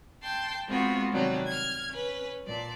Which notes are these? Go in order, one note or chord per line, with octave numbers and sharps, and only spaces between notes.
G5 A5 C6 G6
G#3 B3 C4 F4 F#4
C3 D#3 F#3 G3 D4
F6 G#6
C#4 B4
A#2 D5 A5